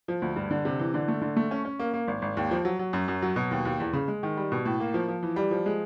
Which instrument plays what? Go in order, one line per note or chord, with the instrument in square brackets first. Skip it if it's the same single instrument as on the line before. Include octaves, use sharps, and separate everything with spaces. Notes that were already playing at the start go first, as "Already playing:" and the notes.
[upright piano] F3
D2
G2
D3
C3
E3
D3
A3
D3
A3
C#4
C#4
A#3
A#3
G#1
G#1
D#2
F3
F#3
F#3
F#2
F#2
F#3
B2
D#2
D#2
E2
C#3
G#3
D#3
G3
B2
A2
A#3
F3
F3
E3
G3
F3
G#3